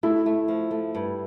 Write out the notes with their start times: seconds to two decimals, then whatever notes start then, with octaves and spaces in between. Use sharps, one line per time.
0.03 A3 E4
0.26 A3
0.48 F3
0.71 A3
0.95 G2